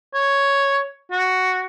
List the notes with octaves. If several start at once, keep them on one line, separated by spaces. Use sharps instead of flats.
C#5
F#4